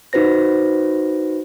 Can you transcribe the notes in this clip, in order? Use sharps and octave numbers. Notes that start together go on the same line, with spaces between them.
D#4 F#4 B4 C5 A#6